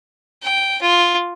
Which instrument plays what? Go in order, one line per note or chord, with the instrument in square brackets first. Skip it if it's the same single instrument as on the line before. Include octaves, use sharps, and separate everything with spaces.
[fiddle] G5
F4